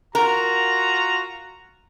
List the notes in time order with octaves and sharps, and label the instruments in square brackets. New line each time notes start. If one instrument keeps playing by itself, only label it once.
[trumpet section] F4 F#4 A#5 [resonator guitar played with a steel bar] A#4